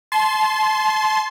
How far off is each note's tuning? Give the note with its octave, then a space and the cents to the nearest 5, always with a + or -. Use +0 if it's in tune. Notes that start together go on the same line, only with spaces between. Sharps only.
A5 -35 C6 +0